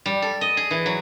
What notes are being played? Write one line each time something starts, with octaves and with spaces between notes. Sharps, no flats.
G3
A4
D#5
G#4
E3
F#3